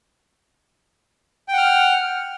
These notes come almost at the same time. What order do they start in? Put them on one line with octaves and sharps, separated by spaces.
G5 F#5 F6